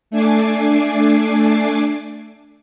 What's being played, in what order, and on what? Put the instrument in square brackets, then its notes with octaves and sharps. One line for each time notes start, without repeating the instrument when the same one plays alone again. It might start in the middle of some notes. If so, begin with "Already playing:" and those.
[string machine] A3 D4 G#5 D6 C7